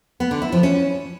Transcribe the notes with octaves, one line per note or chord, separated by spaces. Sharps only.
B3
D3
E4
F3
C#4